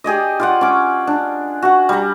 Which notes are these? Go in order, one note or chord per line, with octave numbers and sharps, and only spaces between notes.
G4 G#4 D5 D#5
F4 D5 F#5
C#4 D6
D4
F#4 F#5
G3 A#5